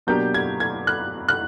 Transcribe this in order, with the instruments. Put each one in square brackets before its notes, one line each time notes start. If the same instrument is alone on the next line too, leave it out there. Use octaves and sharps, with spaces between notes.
[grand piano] B2 F#3 A#3 D4 G4 [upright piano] G6
[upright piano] G#6
G#6
F#6
F#6